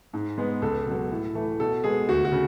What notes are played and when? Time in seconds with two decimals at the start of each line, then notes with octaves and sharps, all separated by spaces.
0.13 G#2
0.38 G#3 B3
0.62 C#2 A4
0.86 B2 F#3
1.11 A2
1.35 E3 A3
1.60 B2 A4
1.84 G#3 B3 G#4
2.08 D2 F#4
2.25 F#4
2.32 C#3